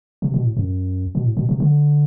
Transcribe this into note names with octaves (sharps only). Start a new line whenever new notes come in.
C3
B2
A2
F#2
B2
A2
B2
C3
D3